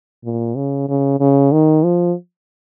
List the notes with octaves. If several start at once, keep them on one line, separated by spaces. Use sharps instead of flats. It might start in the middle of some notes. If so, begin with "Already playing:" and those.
A#2
C#3
C#3
C#3
D#3
F3